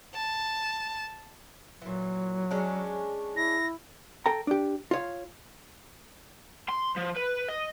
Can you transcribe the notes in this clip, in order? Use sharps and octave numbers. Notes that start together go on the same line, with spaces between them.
A5
A#2 E3 F#3
G#3 C#4 D4
E4 A#6
A4 G5 A#5
D4 G4
F4 C#5 F5
C6
F3
B4
D#5